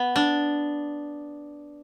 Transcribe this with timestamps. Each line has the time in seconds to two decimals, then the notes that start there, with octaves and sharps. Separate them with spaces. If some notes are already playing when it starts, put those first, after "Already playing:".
Already playing: B3
0.16 D4